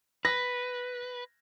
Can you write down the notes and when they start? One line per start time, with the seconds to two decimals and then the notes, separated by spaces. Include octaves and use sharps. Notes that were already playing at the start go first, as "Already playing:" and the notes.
0.25 B4 A#6